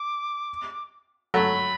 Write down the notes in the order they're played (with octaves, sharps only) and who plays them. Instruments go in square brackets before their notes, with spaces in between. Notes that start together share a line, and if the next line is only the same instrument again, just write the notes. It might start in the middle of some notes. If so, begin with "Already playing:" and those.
Already playing: [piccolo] D6
[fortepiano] F#3 A3 [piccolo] B5